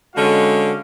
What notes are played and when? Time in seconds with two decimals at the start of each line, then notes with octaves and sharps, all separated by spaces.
0.15 D3 G#3 C#4 F#4 F5